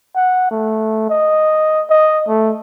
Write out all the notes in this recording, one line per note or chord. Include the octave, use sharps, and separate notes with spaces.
F#5
A3
D#5
D#5
A3